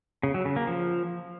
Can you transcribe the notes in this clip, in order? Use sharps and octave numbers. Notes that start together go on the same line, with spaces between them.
C#3
F#3
C#3
A#3
F3